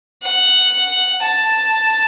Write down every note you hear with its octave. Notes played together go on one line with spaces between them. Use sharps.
F#5
A5